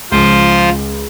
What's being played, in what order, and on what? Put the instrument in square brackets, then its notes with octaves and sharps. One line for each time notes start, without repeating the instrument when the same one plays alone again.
[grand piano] C#2 [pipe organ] F3 F4 C5